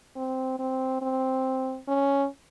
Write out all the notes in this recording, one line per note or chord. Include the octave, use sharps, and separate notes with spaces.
C4
C4
C4
C#4